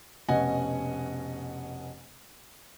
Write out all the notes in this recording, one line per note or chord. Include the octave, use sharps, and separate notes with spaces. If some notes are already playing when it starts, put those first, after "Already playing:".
F1 B2 C#4 D#5 F#5 G#5